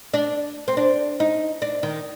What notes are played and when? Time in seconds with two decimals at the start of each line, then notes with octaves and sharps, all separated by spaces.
0.14 D4
0.68 C4
0.77 D4
1.20 D#4
1.62 D4
1.83 D#3